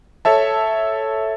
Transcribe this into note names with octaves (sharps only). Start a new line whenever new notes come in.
A4 C#5 E5 A5